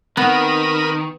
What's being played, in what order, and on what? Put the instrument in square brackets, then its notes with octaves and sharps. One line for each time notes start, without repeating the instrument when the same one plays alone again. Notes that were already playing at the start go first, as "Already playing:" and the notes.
[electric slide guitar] D#3 [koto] B3 [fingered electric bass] C4 [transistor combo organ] A#4 B5 D#6